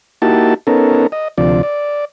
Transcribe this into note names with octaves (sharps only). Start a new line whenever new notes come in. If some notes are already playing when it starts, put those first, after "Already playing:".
A#3 D#4 E4 F#4 G4 A5
B3 C#4 D#4 A4 A#4
D#5
D2 C3 F3 D5
D5